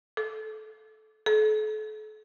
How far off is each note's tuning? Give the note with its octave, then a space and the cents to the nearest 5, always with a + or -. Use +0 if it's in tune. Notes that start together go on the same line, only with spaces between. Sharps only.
A4 -20
A4 -40